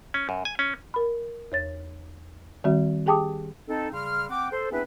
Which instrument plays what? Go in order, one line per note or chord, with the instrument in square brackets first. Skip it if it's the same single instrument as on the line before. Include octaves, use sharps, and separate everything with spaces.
[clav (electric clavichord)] C#4
F#2
G#5
C#4
[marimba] A#4 B5
E2 C#5 A6
D#3 G3 C4 F#4 E5
G4 G#4 G5 A5 D6 D#6
[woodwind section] C4 D#4 A4
C#3 G3 C6 F6
C4 F#5 G5 D6
A4 C5
B3 C4 D4 E4 G#4 B4